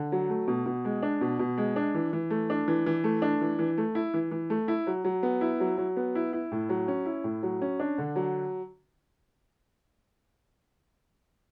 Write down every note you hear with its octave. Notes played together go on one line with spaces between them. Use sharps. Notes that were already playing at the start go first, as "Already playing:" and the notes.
Already playing: D3
F#3
A3
B2
B2
G#3
D4
B2
B2
G#3
D4
E3
E3
A3
D4
E3
E3
A3
D4
E3
E3
A3
E4
E3
E3
A3
E4
F#3
F#3
B3
E4
F#3
F#3
B3
E4
E4
A2
F#3
C#4
E4
A2
F#3
C#4
D4
D3
F#3